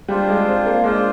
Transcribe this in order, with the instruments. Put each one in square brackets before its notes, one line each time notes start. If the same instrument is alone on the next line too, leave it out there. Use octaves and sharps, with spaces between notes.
[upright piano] G3 [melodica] D4 F4 C5
[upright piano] G#3
C4
A#3
[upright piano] G#3 [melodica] D4 F4 C5